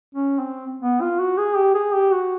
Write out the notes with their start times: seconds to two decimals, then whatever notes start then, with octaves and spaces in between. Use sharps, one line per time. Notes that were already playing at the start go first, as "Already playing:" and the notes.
0.14 C#4
0.39 C4
0.82 B3
1.01 F4
1.20 F#4
1.38 G#4
1.56 G4
1.74 G#4
1.93 G4
2.12 F#4